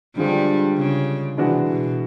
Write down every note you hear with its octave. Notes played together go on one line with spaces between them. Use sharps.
G2 D3 F3 G3 G#3
C#3
C3 E3 G#3 B3 D4 F#4
B2